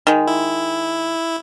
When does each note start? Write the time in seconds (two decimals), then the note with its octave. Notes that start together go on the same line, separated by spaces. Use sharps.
0.07 D#3 G#3
0.27 E4